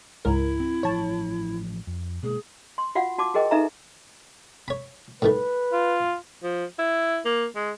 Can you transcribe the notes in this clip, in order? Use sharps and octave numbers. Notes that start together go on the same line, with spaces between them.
C#2 G#2 E4 A#4
C4
A1 F3 C#5 A5
F2
B2 G#3 A#3 G#4
C6
F4 F#4 F5 F#5
F#4 A5 D6
F#4 G#4 A#4 D#5 G5
D#4 A4 B4 E5 F5 A#5
C#5 B5
A2 D#3 A3 B4
F4
F3
E4
A#3
G#3